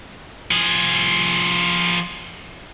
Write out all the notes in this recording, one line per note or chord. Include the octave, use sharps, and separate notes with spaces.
F3 G#4